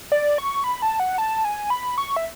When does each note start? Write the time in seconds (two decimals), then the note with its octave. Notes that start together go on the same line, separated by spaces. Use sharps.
0.12 D5
0.38 C#6
0.64 B5
0.82 A5
1.00 F#5
1.18 A5
1.45 G#5
1.70 B5
1.98 C#6
2.17 E5